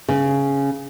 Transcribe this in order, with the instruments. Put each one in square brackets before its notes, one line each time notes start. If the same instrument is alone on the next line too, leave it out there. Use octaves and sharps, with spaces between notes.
[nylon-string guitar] C#3